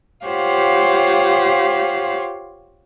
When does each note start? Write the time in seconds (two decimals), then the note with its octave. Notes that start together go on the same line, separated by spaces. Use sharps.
0.26 F4 G4 C5 C#5 F5 F#5